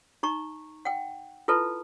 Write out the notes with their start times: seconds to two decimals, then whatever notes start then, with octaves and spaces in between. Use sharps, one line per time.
0.23 D#4 A#5 C#6
0.85 F#5 G5
1.48 E4 F4 A4 B4 A5